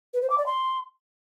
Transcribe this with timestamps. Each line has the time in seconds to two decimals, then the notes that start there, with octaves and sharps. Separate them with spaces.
0.14 B4
0.22 C5
0.30 D6
0.38 D5
0.46 C6